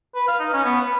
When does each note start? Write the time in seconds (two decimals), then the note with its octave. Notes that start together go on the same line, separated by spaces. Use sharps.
0.15 B4
0.28 F5
0.39 D#4
0.53 C#4
0.64 B3
0.81 B4